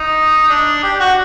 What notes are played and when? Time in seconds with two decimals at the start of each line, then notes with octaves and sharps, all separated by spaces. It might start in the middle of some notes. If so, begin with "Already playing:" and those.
Already playing: D#4
0.49 D4
0.83 G4
1.00 F#4